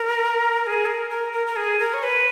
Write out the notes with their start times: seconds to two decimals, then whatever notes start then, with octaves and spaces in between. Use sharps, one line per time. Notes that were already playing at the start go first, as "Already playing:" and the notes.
Already playing: A#4
0.63 A#4
0.67 G#4
0.86 A#4
1.10 A#4
1.33 A#4
1.47 A#4
1.56 G#4
1.79 A#4
1.94 C#5
2.03 B4